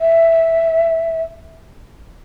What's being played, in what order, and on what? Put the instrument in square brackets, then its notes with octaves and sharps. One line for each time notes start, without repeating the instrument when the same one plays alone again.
[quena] E5